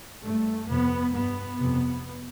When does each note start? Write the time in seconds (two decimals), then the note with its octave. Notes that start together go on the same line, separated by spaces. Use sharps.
0.23 G2 A3
0.68 F2 C3 B3
1.13 G2 B3
1.59 F2 C3